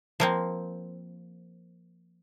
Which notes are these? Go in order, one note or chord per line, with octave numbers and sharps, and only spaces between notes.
F3 A#3 C4